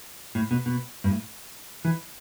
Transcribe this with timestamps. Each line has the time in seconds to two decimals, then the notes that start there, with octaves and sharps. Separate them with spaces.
0.35 A2
0.51 B2
0.66 B2
1.04 G2
1.10 A2
1.85 E3